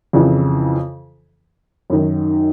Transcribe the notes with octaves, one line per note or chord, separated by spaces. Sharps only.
F2 C#3 E3
F#2 D#3